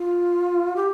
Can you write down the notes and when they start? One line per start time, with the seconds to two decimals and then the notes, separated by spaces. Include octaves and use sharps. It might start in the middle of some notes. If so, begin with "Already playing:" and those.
Already playing: F4
0.76 G4